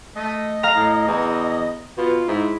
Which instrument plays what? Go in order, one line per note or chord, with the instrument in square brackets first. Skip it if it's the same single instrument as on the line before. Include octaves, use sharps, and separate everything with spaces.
[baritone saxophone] A3 [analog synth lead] D#5
[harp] F5 A#5
[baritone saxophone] A2
E2
[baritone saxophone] B2 [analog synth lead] F4
[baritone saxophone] G#2 [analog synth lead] E4